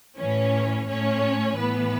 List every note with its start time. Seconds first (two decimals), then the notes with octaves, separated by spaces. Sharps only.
0.19 A2 E3 C#4 C#5
0.88 A2 A3 C#4 C#5
1.56 A2 E3 B3 B4